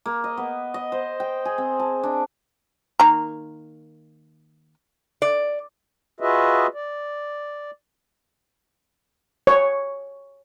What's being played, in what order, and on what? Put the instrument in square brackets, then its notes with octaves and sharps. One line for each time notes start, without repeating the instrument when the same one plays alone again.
[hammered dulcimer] A#3
D#5
B3
D#5
C5
G5
G#4
C4
A5
D4
[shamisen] D#3 A#3 A#5
[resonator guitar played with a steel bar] D5
[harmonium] F4 F#4 G#4 B4 D#5 E5
D5
[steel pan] C#5